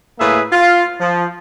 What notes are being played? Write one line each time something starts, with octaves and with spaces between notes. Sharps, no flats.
A2 A#3 G#4 B4 E5
F4 F5
F3